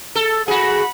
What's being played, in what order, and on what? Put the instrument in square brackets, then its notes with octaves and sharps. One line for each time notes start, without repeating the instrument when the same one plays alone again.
[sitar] A4
[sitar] F#4 G#4 [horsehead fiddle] F#5 B5